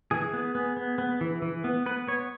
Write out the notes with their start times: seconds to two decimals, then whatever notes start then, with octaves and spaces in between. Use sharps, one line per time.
0.11 E3 G#4
0.33 B3
0.55 B3
0.77 B3
0.98 B3
1.21 E3
1.42 E3
1.64 B3
1.86 B3 B4
2.08 B3 C#5